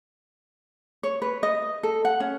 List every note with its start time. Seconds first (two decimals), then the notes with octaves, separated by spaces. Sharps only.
1.03 C#5
1.22 B4
1.43 D#5
1.83 A4
2.05 F#5
2.20 C#4